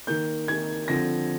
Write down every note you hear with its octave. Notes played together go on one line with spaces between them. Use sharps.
D#3 A#3 G6
D#3 A#3 G#6
D3 F3 C4 A#6